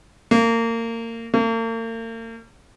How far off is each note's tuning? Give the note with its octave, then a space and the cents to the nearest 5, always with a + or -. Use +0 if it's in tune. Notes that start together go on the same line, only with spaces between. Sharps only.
A#3 -30
A#3 -45